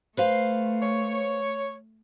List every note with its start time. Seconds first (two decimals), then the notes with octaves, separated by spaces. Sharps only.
0.17 A3 B4 C5 F5
0.82 C#5